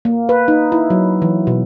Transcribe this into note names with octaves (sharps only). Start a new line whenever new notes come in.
A#3
B4
D#4
E4
F#3
E3
B2